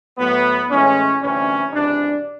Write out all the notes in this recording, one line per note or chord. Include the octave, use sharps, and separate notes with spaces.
A2 F#3 B3
A2 E3 G#3 C#4
D2 C3 E3 G3 C#4
C#2 C3 E3 D4